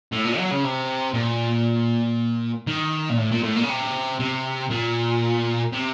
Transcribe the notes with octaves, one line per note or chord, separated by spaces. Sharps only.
A2
A#2
F#3
C#3
C3
A#2
D#3
A#2
A2
A#2
A2
A#2
C#3
C3
C3
A#2
C3